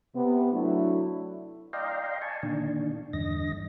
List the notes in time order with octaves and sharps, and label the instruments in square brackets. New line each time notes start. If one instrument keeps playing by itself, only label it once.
[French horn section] C3 B3
F#3 A3 D4 E4
[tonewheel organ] D5 D#5 F5 G5 A#5 C6
G#5 A5 C#6
A#2 D3 D#3 D4
E2 G2 D3 D#5 A#6